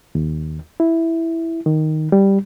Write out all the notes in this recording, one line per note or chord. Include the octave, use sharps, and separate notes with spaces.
D#2
E4
D#3
G3